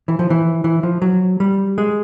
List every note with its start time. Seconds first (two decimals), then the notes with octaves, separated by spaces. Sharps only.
0.08 E3
0.19 F3
0.30 E3
0.64 E3
0.83 F3
1.02 F#3
1.40 G3
1.78 G#3